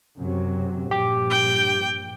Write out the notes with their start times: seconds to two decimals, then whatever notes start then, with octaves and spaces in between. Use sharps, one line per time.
0.18 F#2 C3 F#3
0.91 A#1 G2 G4 D6
1.30 G5